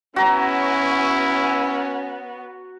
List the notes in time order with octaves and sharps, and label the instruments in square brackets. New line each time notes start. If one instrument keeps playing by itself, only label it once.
[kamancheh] B3 [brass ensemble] C#4 [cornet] E4 [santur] F#4 A#5